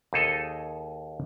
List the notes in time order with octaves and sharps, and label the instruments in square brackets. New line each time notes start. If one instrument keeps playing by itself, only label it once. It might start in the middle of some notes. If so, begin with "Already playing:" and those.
[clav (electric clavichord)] D#2 D#4 G#4 A4 C#5 D#5